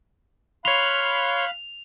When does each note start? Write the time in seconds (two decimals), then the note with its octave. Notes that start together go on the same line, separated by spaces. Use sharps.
0.65 C#5 F5 B5 C6 F#6 F7